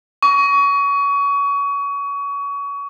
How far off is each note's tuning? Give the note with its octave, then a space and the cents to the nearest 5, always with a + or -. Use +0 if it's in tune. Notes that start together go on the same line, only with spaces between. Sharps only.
C#6 +30